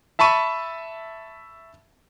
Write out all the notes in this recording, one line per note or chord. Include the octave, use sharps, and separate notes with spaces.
E5 A5 B5 C#6 D#7